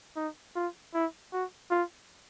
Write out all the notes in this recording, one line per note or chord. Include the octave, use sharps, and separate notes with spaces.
D#4
F4
E4
F#4
F4